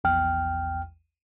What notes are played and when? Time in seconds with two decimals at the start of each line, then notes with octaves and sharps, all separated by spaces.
0.04 A#1 E2 G5 F6